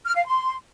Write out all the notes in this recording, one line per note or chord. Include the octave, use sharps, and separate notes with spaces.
F6
F5
C6